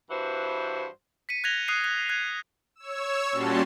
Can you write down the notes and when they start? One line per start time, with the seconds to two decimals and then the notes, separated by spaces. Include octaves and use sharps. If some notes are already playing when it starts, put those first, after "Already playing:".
0.10 G2 E3 F#4 C5
1.29 B6 C#7 D#7
1.44 F#6 G#6 A#6 F7 G7
1.68 D#6 F#6 C7 D#7
1.84 F#6
2.09 F#6 G#6
2.76 C#5 E6
3.32 A#2 G3 C#4 F#4 A5 C6